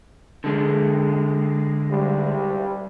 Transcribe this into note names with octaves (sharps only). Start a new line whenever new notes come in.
D3 G#3
G3